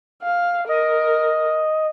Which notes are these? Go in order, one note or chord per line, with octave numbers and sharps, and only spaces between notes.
F5
A#4 D#5